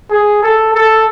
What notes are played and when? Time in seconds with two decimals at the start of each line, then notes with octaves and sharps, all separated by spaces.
0.10 G#4
0.43 A4
0.74 A4